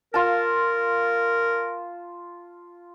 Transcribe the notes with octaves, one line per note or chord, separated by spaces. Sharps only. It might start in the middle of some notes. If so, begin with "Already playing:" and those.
F4 A#4 A5